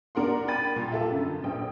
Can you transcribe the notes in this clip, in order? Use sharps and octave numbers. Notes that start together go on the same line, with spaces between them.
D4 A#4 F#5 C6
G5 B5 A6 D#7
A#2
F4 A4 E5
F#2 D3
A#1 G5